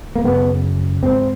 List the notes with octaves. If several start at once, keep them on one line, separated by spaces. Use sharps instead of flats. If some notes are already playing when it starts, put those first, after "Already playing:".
A#3
F#2 C#3 B3
G#2 C4